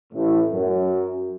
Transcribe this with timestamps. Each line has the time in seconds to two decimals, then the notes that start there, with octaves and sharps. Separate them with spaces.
0.12 A1 A2
0.52 F#2